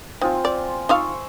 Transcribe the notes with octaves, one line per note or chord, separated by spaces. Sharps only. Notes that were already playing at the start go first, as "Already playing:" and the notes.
C4 D#4 F4 G#5
D5
D#4 F4 E5 F5 C6 C#6